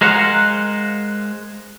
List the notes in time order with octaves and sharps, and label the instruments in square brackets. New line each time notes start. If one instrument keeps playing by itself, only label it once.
[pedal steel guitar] G#3 A#4 C5 F5 F#5